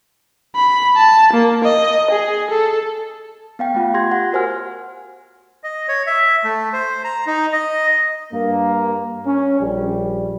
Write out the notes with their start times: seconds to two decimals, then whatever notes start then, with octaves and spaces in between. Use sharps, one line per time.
0.56 B5
0.96 A5
1.33 A#3
1.64 D#5
2.10 G#4
2.50 A4
3.59 B3 F5 G5
3.74 A3 F4 F#5
3.94 G4 C6 G6 G#6 A#6
4.11 F#5
4.32 F#4 A#4 C5 G#5 F6
5.64 D#5
5.88 C#5
6.07 E5
6.44 A3
6.73 C5
7.04 A#5
7.27 D#4
7.53 D#5
8.33 G2 A#3
9.26 C#4
9.60 A#1 G3